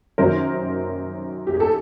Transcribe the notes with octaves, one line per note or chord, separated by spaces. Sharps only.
F#2 D#3 F#3 A#4 C5
G4
G#4
A4